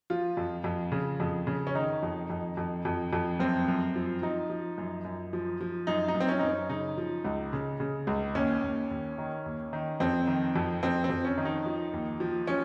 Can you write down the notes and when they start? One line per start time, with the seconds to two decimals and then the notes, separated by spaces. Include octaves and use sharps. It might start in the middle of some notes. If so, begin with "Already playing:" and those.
0.10 F3 F4
0.37 F2
0.64 F2
0.92 C#3
1.20 F2
1.47 C#3
1.67 C#4
1.75 D#3 D#4
2.03 F2
2.30 F2
2.57 F2
2.85 F2
3.13 F2
3.39 F#2 C4
3.68 F#2
3.95 F3
4.22 F3 D#4
4.50 F3
4.78 F#2
5.05 F#2
5.33 F3
5.61 F3
5.87 F#2 D#4
6.08 D#4
6.15 F#2
6.20 C4
6.29 C#4
6.39 F#2 D#4
6.49 C#4
6.69 C#3 D#4
6.98 F3
7.25 C#2
7.53 C#3
7.80 C#3
8.07 C#2
8.35 D#2 C#4
8.63 D#2
8.91 D#2
9.18 D#3
9.46 D#2
9.73 D#3
10.00 F2 C4
10.27 D#3
10.56 F2
10.83 F2 C4
11.04 C4
11.10 F2
11.25 C#4
11.37 D#3
11.45 D#4
11.66 F3
11.93 D#2
12.20 F3
12.47 F3 C#4